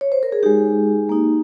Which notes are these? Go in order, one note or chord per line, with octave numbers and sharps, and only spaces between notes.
C#5
C5
A#4
G#4
G#3 D#4 G4
A#3 D#4